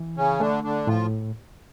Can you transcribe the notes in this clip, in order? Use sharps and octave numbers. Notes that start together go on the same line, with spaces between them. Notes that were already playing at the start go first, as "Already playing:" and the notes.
Already playing: E3
C#3 C#4
D3 A3 D4
D3 D4
A2 F3 F4